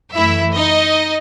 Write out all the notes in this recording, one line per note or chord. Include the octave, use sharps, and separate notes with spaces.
F#2 E3 A3 E4 E5
D#4 D#5